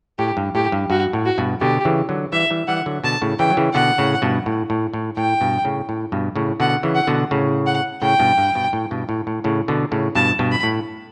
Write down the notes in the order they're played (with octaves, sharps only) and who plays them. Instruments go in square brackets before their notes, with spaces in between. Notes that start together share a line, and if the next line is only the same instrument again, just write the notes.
[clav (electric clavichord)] A2 [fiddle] G4
[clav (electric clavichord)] G2
[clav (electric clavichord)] A2 [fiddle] G4
[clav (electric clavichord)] G2
[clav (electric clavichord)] G2 [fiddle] F#4
[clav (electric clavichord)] A2
[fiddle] F#4
[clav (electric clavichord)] G2 B2
[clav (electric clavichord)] B2 D3 [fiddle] G4
[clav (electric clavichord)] C#3 E3
D3 F#3
[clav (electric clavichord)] E3 G3 [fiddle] E5
[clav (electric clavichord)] E3 G3
[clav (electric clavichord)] E3 G3 [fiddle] F#5
[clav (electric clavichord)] D3 F#3
[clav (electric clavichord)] B2 D3 [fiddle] A5
[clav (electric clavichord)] A2 C#3
[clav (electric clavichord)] C#3 E3 [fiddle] G5
[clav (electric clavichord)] F#3
C#3 E3
[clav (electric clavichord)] B2 D3 [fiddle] F#5
[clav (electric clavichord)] A2 C#3
G2 B2
A2
A2
A2
[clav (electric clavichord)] A2 [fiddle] G5
[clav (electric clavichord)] G2 B2
A2 C#3
A2
G2 B2
A2 C#3
[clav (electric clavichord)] B2 D3 [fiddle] F#5
[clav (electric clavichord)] C#3 E3
[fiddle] F#5
[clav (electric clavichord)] B2 D3
A2 C#3
[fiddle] F#5
[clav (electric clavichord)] A2 C#3 [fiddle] G5
[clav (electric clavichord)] G2 B2
G2
G2 B2
A2
G2 B2
A2
A2
A2 C#3
B2 D3
A2 C#3
[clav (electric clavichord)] G2 B2 [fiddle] A5
[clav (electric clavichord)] G2 B2
[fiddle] B5
[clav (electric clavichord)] A2